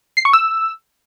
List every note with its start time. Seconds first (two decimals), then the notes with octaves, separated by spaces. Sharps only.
0.17 C7
0.25 C#6
0.33 E6